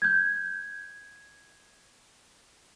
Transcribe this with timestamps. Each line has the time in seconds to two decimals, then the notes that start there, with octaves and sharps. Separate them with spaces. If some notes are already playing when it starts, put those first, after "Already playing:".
0.02 G6 G#6